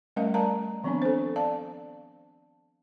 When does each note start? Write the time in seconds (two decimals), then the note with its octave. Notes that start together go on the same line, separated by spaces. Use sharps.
0.16 G3 A3 C#4 A#4 D#5 F5
0.34 A#4 D5 D#5 F5 A5 A#5
0.84 D#3 F3 B3 C4 D4 G#5
1.02 A4 C5
1.36 D5 F5 A5